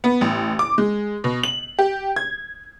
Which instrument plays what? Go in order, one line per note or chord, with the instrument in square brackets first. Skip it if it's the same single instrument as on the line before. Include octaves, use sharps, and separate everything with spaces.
[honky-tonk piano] B3
A1
D6
G#3
B2
F#7
G4
G#6